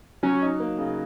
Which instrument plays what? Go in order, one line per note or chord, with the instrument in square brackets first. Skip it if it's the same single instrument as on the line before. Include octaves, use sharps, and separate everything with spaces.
[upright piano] F#3 [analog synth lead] C#4
[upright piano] D#4
A#3
C#3